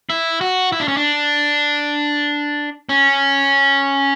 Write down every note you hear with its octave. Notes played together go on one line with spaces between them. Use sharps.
E4
F#4
E4
D4
C#4
D4
C#4